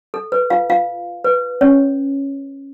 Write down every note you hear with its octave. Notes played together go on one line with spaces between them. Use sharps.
A4
B4
F4 F5
F4 F5
B4
C#4 C#5